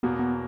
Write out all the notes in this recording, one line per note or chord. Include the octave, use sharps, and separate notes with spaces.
E2 B2 F#3 A#3 B3
B3